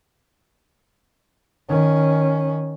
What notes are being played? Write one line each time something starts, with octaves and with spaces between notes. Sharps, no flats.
D#3 C#4